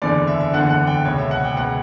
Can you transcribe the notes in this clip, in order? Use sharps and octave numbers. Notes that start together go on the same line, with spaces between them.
F#1 E2 D3 D5
E5
E5
F#1 E2 D3 F#5
F#5
G5
C#2 B2 C#5
E5
F#5
G5
C#2 B2 F#5